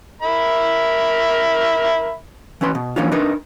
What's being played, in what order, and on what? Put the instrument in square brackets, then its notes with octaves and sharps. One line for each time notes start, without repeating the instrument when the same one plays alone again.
[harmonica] A#4 E5 B5
[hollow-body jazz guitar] E3 C#4 B4 C6
B2
E3 F3 A#3 C#4 D4 F4
D4 D#4 A#4 B4